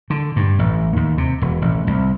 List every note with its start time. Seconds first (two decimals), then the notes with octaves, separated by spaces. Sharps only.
0.10 D3
0.36 G2
0.59 A1
0.97 D#2
1.18 C3
1.42 E1
1.62 A1
1.87 C2